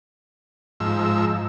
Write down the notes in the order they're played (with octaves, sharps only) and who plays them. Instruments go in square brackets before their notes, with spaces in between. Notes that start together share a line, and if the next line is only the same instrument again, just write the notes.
[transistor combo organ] G#2 F3 E6